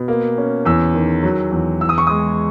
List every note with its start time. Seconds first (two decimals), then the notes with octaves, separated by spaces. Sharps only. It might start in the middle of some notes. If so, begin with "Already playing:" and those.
Already playing: B2
0.08 A#3
0.38 C#4
0.65 E2 E6
0.94 D#3
1.23 F#3
1.52 E2
1.81 E3 E6
1.89 D#6
1.98 C#6
2.07 G#3 D#6